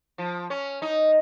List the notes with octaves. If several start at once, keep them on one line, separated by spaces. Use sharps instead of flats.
F3
C#4
D#4